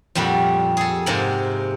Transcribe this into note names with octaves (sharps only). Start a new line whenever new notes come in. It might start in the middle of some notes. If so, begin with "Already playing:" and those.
F2 A#2 G3 F#4 B5
G#4 A4
G#2 C3 A#3 A#4 F#5 B5